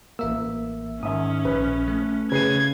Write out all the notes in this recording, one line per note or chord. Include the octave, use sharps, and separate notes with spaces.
A1 A#3 E5 E6
G#2 D#3 C#4 E5 D#6
A#1 B4
A3
C#3 B4 G#6 C7 D#7